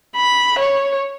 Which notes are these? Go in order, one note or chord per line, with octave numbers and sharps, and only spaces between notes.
B5
C#5